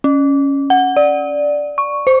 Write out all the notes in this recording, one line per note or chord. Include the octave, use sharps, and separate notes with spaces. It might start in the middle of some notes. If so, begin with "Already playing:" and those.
C#4
F#5
D5
C#6
C5